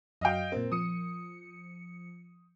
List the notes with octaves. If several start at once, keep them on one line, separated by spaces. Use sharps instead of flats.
F#2 F#3 D#5 F5 G5
A#2 C4 A#4
F3 D#6 C#7